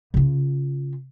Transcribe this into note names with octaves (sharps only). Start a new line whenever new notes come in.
C#3 F4